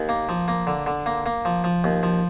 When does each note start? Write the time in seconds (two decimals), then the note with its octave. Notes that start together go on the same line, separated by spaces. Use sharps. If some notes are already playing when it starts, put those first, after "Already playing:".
Already playing: D#2
0.09 A#3
0.29 F3
0.48 A#3
0.67 D3
0.86 D3
1.06 A#3
1.26 A#3
1.45 F3
1.64 F3
1.84 D#2
2.03 F3